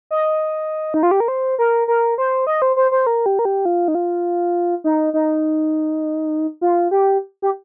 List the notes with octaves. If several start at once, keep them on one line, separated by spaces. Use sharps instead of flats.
D#5
D#4
F4
G4
A#4
C5
A#4
A#4
C5
D#5
C5
C5
C5
A#4
G4
A#4
G4
F4
D#4
F4
D#4
D#4
F4
G4
G4